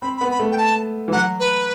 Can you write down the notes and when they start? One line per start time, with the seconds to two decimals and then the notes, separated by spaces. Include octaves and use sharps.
0.02 C4 B5
0.17 B5
0.21 B3
0.32 B5
0.39 A3
0.52 G5
0.58 A5
1.08 E3
1.12 F#3 F#5
1.40 B4